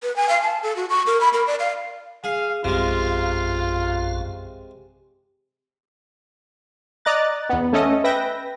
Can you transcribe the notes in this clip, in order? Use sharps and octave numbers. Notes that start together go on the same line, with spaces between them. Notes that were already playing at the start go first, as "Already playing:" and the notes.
B4
G#5
F5
A5
A4
F#4
C#6
A#4
B5
A#4
D5
F5
G#4 F5
A#1 F#2 C3 G#3 F4 F5
D5 D#5 A#5 F#6 A6
E2 B3
A3 C#4 A4 D#5
B4 E5 G5 A#6